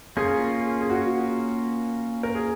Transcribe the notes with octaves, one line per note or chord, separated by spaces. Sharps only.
A#3 C#4 F4 G#4
G#4
F#4
A#4
G#4